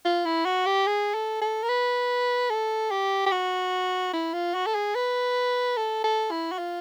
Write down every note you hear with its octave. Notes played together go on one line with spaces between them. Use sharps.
F4
E4
F#4
G4
G#4
A4
A4
A#4
B4
A4
G4
G4
F#4
E4
F4
F#4
A4
G#4
B4
A4
A4
E4
F#4
F4